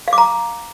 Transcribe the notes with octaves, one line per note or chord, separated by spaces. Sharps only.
F5
D6
A#5